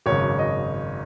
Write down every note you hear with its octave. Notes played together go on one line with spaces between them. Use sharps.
G#1 F#2 C#3 C#5
D#5